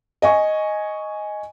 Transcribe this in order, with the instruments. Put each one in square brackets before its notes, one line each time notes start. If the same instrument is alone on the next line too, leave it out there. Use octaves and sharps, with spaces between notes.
[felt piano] D#5 G#5 C#6